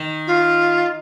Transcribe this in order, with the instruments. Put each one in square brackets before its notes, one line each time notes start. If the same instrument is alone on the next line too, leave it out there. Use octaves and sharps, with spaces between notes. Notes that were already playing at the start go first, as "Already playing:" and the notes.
Already playing: [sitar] D#3
[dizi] F4